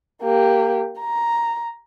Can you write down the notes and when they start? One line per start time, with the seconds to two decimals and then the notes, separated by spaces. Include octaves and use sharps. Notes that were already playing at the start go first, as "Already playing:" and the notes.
0.22 A#3 G4
1.00 A#5